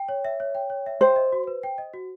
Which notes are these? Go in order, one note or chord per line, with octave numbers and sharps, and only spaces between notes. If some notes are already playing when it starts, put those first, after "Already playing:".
Already playing: G5
C#5
E5
C#5
G5
C#5
E5
C5 G5
D#5
F#4
B4
G5
D#5
F#4